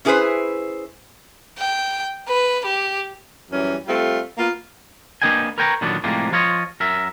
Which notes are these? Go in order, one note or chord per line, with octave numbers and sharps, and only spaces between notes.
C#4 E4 G#4 A4 B4 C5
G5
B4
G4
F#2 E3 G3 C#4
G3 A3 C4 F4
A#3 B3 F4
A#3 D4 B4 D#5 G5 G#5
A#4 B4 C#5 G5 A5 A#5
A#2 D3 D#3 F#3 B3 D4
A2 C3 F3 G3 G#3 A#3
F3 F4 C#5 D#5
F#2 A#4 E5